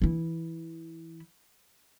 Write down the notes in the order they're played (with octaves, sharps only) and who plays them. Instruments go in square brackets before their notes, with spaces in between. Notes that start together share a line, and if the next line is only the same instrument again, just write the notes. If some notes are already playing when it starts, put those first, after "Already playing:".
[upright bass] E3 E4